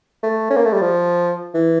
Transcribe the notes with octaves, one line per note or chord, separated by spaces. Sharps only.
A3
C#4
A#3
A3
G3
F3
E3